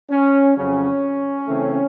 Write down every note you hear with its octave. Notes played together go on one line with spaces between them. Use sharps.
C#4
F2 C#3 F#3 C#4
C#3 E3 A3 C4